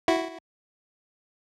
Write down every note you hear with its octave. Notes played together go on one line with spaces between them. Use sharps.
E4 F#4